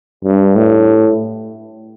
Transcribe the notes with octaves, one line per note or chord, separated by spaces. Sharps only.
G2
A2